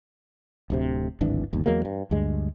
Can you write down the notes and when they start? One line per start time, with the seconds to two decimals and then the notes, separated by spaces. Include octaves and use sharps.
0.70 D1 D2 C3
1.21 D1 G#1 E3 D4
1.53 G1 D#2
1.66 E2 F#3 G#3 A#3
1.85 G2
2.11 D2 G2 G#3